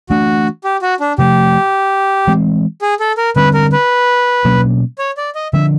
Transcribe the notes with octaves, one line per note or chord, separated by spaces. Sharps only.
E3 A3 D4 F#4
G4
F#4
D4
C3 F3 A3 G4
E3 G#3 C4
G#4
A4
A#4
D3 G3 C4 B4
A#4
B4
B2 F#3 A#3 C#4
C#5
D5
D#5
D3 F3 A#3 D4 E5